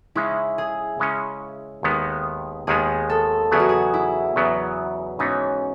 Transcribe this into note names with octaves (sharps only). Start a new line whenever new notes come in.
C#3 G#3 C#4 E4
G#4
C#3 G#3 C#4
D#2 D#3 G#3 B3
D#2 D#3 G#3 B3 G#4
A4
E2 C#3 F#3 B3 G#4
F#4
G#4
E4
E2 C#3 F#3 B3
G#2 E3 B3 C#4 D#4